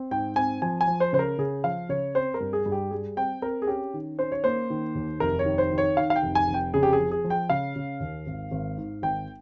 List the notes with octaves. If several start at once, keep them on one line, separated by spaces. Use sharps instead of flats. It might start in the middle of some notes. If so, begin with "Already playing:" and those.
Already playing: C4
G#2 G5
C4 G#5
F3 G#5
G#5
F3
C5
C#3 C5
A#4
C#3 G#4
F3 F5
C#3 C#5
C4 C5
A#4
G2
G#4
G2
G4
G3 G#4
C4 G5
C4 A#4
G#4
C#4 G4
D#3
C#4 C5
C#5
A#3 C5
D#3
D#2
F1 A#4
C#5
D#3
C5
D#3
C#5
D#3 F5
F5
G5
F1
G#5
F1
G5
C#3 G#4
G4
G#4
F3
G#4
F3
G5
C#3 F5
C#3
D#2
G#1
G#1
G#2
G#1 G5